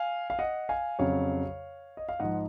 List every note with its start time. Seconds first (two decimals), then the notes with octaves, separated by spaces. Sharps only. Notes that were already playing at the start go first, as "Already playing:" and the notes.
Already playing: F5 G#5
0.30 F5
0.39 D#5 F#5
0.69 F5 G#5
0.99 F2 C#3 F#3 C#5 F5
1.97 D#5
2.09 F5
2.20 G#2 F3 D#5 F#5